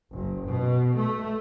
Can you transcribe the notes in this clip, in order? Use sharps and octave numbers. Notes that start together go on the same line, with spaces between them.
F#1
B2
A3